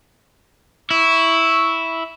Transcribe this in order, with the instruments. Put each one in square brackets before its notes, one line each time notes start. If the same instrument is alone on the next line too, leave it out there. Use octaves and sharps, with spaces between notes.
[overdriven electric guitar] E4 [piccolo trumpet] C#6